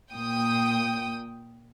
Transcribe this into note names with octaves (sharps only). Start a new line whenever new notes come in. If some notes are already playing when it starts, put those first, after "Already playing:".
A#2 G5 D#6